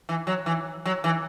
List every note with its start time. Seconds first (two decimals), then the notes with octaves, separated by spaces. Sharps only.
0.09 E3
0.27 F#3
0.46 E3
0.85 F#3
1.04 E3